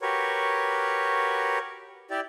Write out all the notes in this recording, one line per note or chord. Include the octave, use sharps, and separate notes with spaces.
F#4 G4 A#4 B4 C#5
E4 G4 D5